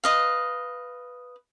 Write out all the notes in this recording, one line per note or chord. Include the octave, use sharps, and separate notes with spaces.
B4 D#5 F5